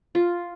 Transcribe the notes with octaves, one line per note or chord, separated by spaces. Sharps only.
F4